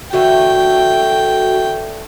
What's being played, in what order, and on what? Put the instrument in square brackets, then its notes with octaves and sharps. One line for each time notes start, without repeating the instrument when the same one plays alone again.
[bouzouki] D3 E3 A3 [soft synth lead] F#4 [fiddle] G5